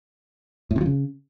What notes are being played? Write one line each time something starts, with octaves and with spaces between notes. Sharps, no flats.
A2
C3
F3
C#3